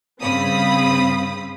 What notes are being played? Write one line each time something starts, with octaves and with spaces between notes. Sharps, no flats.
G2 C#3 C4 F5 B5 D#6